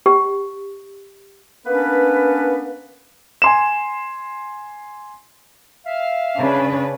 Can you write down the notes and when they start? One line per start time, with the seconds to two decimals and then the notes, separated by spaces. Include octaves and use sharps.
0.06 G4
1.66 A#3 B3 C#4 D4 B4
3.42 G#5 C6 E7
5.86 E5 F5
6.40 C#3 D4 B4